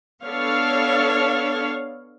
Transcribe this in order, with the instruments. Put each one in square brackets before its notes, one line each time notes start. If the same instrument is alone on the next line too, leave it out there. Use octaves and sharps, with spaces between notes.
[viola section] B3 D4 A4 C#5 F5